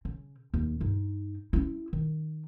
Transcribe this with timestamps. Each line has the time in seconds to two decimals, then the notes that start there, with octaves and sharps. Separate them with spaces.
0.05 C#3
0.54 D#2
0.80 G2 D#4
1.53 C#4 E4
1.93 D#3